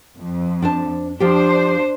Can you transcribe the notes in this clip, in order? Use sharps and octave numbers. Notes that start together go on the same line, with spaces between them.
F2
D4 C5 A5
F3 D4 G4 C5